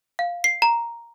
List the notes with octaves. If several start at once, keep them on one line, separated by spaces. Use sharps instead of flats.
F5
C7
A#5